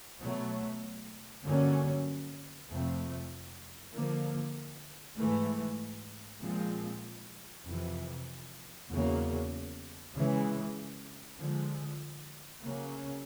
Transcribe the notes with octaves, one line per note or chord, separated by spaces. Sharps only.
B2 F#3 A3
G2 D3 F#3 A#3 C#4
F2 C3 F3 A3 C4
D3 F3 A#3
G#2 E3 A3
A#2 F3 G#3 C4
F2 C3 E3
E2 C#3 F#3 A#3
C#3 E3 G#3
D3 F3 G#3
C#3 F#3 A#3 C#4